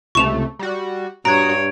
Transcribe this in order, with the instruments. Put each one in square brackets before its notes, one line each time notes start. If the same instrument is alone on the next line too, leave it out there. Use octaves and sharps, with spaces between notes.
[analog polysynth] C#2 C3 A3 [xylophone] C#6 E7 F7
[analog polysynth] G3 F#4
[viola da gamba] G2 C#5 [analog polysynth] F#4 D#6 [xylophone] A#5 [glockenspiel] G#6 D7